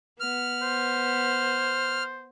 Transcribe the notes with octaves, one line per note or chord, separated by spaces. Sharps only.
B3 F6
C5